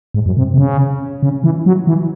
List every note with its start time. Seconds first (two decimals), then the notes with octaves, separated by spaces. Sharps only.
0.14 G#2
0.26 F#2
0.37 C3
0.54 C3
0.58 C#3
1.23 C#3
1.44 E3
1.66 F#3
1.87 E3